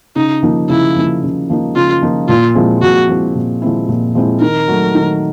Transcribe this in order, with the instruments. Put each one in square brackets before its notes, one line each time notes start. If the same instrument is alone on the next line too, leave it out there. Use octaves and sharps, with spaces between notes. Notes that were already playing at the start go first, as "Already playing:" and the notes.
[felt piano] C#3 [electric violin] D#4
[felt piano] F3 A#3 D#4
[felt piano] C#3 [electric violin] E4
[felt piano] F3 A#3 D#4
C#3
F3 A#3 D#4
[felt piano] C#3 [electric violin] F4
[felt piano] F3 A#3 D#4
[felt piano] A#2 [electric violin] F4
[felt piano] F3 G#3 C4 E4
[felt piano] A#2 [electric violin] F#4
[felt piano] F3 G#3 C4 E4
A#2
F3 G#3 C4 E4
A#2
F3 G#3 C4 E4
[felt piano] D#3 [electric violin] A#4
[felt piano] F#3 A3
D#3